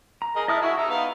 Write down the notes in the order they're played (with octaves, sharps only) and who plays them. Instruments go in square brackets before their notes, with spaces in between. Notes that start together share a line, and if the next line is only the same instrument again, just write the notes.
[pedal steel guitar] A#5
[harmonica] G#4 A#4 D#5
[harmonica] E4 A5 [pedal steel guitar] D#5 D#6 F6
[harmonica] E4 F#4 [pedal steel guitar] G#4 C#6
[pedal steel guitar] D#4 [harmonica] A#5 E6
[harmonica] B3 F5